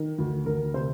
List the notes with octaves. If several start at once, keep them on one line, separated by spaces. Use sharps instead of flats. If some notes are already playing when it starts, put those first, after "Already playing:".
Already playing: D#3
D2
D2 A#4
C3 C5